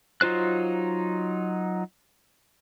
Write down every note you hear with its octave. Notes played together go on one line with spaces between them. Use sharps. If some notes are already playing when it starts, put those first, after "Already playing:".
F#3 D#4 F4 C5 F#6